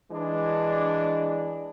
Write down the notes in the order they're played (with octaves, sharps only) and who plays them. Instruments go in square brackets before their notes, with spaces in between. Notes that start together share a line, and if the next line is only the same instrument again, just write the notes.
[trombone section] E3 G#3 D4